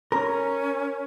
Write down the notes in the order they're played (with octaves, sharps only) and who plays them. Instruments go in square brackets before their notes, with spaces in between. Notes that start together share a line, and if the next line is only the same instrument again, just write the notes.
[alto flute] C#4 [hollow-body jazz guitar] A#4